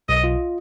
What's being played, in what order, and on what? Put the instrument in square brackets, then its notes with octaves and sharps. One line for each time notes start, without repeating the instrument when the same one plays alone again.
[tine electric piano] B1 [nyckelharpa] D#5
[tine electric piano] F4